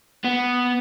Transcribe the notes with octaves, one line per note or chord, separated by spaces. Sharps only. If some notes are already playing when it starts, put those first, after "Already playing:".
B3